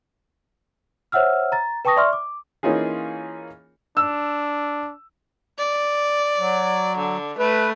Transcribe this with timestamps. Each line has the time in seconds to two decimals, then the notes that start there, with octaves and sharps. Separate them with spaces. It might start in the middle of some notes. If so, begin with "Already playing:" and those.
1.12 C5 C#5 E5 F#5 E6 F6
1.52 A#5 A6
1.85 B4 G5 A5 C#6 D#6 A#6
1.97 D5 E5 C6 C#6 F6
2.13 D6
2.63 E3 A#3 C#4 D#4 F4 G#4
3.97 D4 E6
5.59 D5
6.38 F#3
6.98 D3
7.39 A3 B4